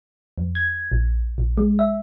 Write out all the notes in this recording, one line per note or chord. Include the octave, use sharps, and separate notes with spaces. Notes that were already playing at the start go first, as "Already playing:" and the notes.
F2
G#6
A#1
A#1
G#3
E5